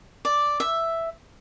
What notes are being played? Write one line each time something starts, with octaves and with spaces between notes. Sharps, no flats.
D5
E5